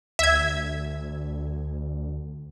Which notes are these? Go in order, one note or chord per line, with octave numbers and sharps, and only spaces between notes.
D2 E5 G#6